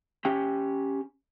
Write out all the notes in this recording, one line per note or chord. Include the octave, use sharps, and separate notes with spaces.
C#4 G4 G5